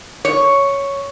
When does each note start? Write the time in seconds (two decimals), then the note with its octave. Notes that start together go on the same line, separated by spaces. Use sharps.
0.25 C#5